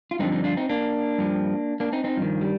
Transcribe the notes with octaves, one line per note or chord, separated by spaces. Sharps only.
F4
G2 D3 F3 C4 D#4
C4 D#4
D4 F4
C4 D#4
A#3 D4
G2 F3
A#3 D4
C4 D#4
C4 D#4
G2 D#3 F3
G3